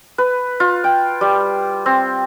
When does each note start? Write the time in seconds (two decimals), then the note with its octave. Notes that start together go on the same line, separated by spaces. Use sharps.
0.18 B4
0.60 F4
0.84 G5
1.21 G3
1.86 C4